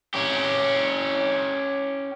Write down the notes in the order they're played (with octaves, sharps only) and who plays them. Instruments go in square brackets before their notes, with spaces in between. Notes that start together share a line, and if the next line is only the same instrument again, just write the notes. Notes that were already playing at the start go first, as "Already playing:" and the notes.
[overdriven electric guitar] C#4 G4